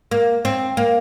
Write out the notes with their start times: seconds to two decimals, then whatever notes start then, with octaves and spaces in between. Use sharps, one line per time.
0.11 A#3
0.45 C4
0.77 A#3